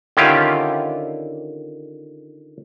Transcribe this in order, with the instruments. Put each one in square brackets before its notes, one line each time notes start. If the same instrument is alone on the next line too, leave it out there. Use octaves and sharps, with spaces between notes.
[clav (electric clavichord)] D3 D#3 C#4 E4 F4 G4